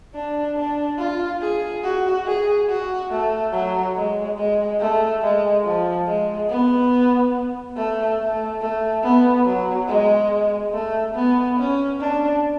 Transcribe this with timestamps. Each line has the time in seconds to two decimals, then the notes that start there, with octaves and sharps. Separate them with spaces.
0.14 D4
0.56 D4
0.99 F4
1.41 G#4
1.84 F#4
2.26 G#4
2.68 F#4
3.10 A3
3.53 F#3
3.96 G#3
4.37 G#3
4.80 A3
5.22 G#3
5.65 F3
6.07 G#3
6.50 B3
7.76 A3
8.19 A3
8.61 A3
9.04 B3
9.46 F#3
9.88 G#3
10.73 A3
11.15 B3
11.58 C#4
12.00 D4